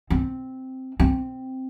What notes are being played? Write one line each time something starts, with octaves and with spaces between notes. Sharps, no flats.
C4
C4